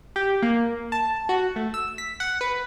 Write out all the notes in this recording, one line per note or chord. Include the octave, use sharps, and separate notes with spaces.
G4
A#3
A5
F#4
A3
E6
B6
F#5
B4